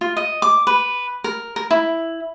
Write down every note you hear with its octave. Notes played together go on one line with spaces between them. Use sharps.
F4
D#5
D6
B4
A#4
A#4
E4